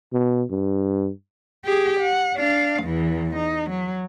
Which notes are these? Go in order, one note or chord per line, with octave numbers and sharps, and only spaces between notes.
B2
G2
G4 G#4
F#5
D4 F5
E2 E3
D#4
F#3